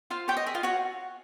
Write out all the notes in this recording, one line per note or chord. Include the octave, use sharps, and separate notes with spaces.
F4 C5 F5
G4 C#5 G5
D#5
G#4 E5
F4 F5
F#4 C#5 F#5